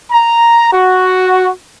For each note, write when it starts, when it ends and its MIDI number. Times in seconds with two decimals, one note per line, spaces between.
0.12 0.71 82
0.73 1.50 66